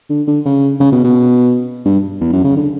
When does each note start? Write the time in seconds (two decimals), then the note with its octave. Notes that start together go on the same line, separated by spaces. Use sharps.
0.10 D3
0.27 D3
0.45 C#3
0.80 C#3
0.92 B2
1.04 B2
1.85 G2
2.21 E2
2.32 F#2
2.44 C#3
2.56 D3